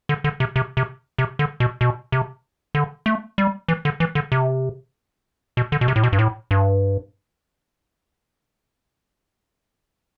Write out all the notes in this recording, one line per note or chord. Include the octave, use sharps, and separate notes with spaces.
D3
D3
C3
C3
C3
C3
D3
B2
B2
C3
D3
A3
G3
E3
D3
E3
D3
C3
B2
D3
B2
C3
A2
B2
G2
A2
G2